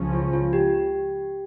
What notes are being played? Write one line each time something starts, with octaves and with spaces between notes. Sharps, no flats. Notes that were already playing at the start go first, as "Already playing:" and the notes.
Already playing: C#2 C#3 F3 C#4
F4
F4
G4